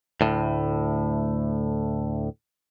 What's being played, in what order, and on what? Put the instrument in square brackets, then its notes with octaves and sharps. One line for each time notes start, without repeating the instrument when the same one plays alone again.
[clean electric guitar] D2 A2